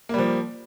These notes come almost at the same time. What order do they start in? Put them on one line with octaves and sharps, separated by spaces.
A#3 G3 F3